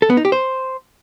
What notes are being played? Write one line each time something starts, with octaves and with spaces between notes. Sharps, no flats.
A4
B3
D#4
G4
C5